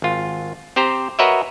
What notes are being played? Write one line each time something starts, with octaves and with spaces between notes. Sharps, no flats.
G#1 F4
C4 G4 C5 A#5
F#4 A#4 B4 C#5 D#5 E5